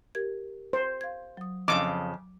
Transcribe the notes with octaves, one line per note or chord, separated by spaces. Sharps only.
G4 A#4 G#6
C5
F5 G#6
F#3 D#6
F2 A2 C#3 D6